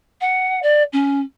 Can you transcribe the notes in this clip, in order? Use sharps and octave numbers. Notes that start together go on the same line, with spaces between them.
F#5
D5
C#4